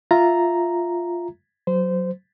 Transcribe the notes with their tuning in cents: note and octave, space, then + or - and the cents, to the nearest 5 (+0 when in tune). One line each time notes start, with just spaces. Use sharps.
F4 +0 E5 +0 A#5 +0
F#3 +0 C5 -20